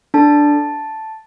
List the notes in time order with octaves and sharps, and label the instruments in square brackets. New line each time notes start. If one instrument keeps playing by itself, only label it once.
[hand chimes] D4 A4 A5